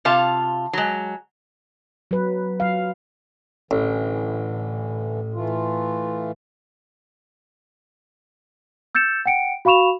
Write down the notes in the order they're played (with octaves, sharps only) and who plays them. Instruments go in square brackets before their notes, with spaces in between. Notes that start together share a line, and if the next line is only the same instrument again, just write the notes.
[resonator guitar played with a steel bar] C3 F4 F5 A5
F#3 G#3
[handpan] F#3 B4
F#3 F5
[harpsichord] A1 [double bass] A2 [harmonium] D3 E3
[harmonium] E3 A3 F4
[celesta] E6 G6 A6 C#7 E7
F#5 G5 C#7 D7
F#4 F5 B5 C#6 E7 F7